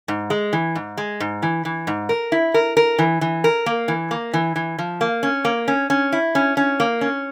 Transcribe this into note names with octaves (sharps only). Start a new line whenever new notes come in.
G#2
G#3
E3
G#2
G#3
G#2
E3
E3
G#2
A#4
E4
A#4
A#4
E3
E3
A#4
A#3
E3
A#3
E3
E3
F3
A#3
C#4
A#3
C#4
C#4
E4
C#4
C#4
A#3
C#4